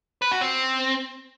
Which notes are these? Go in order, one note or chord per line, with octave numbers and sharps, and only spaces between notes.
B4
F#4
C4